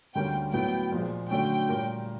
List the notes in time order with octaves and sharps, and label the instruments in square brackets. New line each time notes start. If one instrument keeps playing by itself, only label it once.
[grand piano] D2 D3 G3 A#3 C#4 [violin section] G5
[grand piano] A2 F#3 B3 [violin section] G5
[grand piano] A#2 F3 G#3
[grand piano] D3 F#3 A3 C#4 [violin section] G5
[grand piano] A#2 G3 A#3